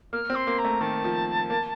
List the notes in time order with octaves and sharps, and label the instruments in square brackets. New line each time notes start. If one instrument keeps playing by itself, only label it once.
[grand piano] A#3 [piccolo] F6
[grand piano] C4
[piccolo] C6
[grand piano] A#3
[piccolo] A#5
[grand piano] A3
[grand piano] D#3 [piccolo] A5
[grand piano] F3
A#3